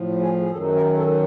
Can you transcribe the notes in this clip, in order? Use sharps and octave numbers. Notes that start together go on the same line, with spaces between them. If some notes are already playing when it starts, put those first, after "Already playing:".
Already playing: A2 F3
G#4
G#4
F#2 D#3 F#3 A4
A#4
A4